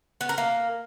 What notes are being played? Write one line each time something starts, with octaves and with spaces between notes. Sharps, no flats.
B3
A#4
A#3